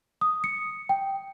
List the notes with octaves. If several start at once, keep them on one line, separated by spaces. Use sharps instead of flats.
D#6
C#7
G5